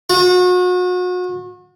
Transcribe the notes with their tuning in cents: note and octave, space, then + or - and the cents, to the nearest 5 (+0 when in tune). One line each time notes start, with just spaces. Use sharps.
F#4 -35